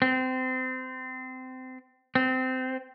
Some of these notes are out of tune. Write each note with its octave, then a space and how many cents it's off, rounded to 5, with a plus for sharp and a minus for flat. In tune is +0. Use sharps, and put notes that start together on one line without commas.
C4 -25
C4 -20